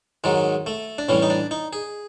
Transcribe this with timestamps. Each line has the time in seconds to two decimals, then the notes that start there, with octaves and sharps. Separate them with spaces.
0.24 G#2 D#3 F#3 G#3
0.66 A3
0.98 D4
1.09 A2 E3 G3 C#4
1.22 D#4
1.30 D4
1.51 D#4
1.73 G#4